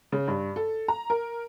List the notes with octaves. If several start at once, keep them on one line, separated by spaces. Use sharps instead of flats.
C#3
G2
A4
A#5
A#4